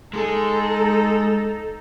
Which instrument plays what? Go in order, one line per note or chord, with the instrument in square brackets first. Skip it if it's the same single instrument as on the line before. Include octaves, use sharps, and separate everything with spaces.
[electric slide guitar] G#3 G#4 [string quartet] D#4 A4